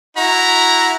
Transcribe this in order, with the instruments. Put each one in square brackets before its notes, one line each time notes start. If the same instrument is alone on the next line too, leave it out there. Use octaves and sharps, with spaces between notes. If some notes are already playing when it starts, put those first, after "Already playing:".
[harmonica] E4 F#4 [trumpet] A#5